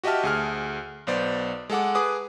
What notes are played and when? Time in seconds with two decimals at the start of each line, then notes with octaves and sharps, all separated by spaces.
0.04 F#4 G4 D#5 E5 A5 F6
0.23 D2 G#4 F6
1.07 B1 B3 C5 D5
1.70 G#3 A4 F#5 D6
1.95 G#4 B4 D6 D#6